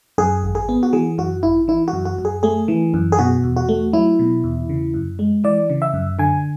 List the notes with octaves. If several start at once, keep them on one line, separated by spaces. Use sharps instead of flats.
F#2 G#4
G#1
G#4
B3
F#4
E3 G#4
F#2 F#4
G#1 E4
E3 E4
F#4
F#2
F#4
F#2
G#4
A3 G#4
E3
F#2
G#4
B2 F#4
E2
F#4
A3
F#3 E4
B2
E2
C#3
F#2
G#3
E3 D5
C#3
E5
F#2
D3 G#5